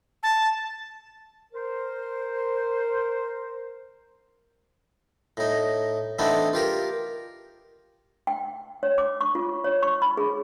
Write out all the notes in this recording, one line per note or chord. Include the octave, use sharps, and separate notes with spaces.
A5
A#4 C5
A2 D#4
E3 A3 B3 C4 D4 D#4
F4 G4 A#4
G5
C#5
D6
C#6
F4
C#5
C#6
B5
G#4